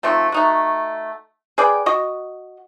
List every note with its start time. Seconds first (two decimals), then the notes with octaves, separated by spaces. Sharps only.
0.03 D#3 F3 A3 C4
0.32 A3 D#4 F#4
1.58 G#4 B4 D5 G5
1.86 F#4 D#5